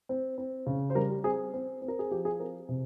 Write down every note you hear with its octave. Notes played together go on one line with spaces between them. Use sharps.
C4
C4
C#3
C5
G3 A#4
G4
C4 G#4
C4
C4
A#4
G#4
F3 G4
G#4
C4 A#4
C3